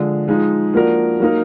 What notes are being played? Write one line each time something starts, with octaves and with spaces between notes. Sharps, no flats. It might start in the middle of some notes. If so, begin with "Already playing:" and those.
Already playing: D3 F3 G#3
F3 G#3 D#4
F3 A#3 D4 F#4 A#4
F#3 A#3 D#4 A#4